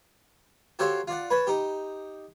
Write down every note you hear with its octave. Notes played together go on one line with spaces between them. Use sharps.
F#4 G4 A4 C5 C#5 F5
F4 D5 F#5
B4 C#5 A5
D#4 G4